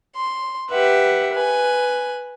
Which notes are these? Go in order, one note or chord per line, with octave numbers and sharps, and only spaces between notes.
C6
G4 B4 E5 F#5
B4 G#5